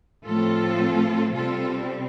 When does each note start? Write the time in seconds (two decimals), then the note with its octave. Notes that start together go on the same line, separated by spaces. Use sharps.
0.24 A2 F3 A3 C4 F4 A4
1.35 C3 G3 C4 F4 A4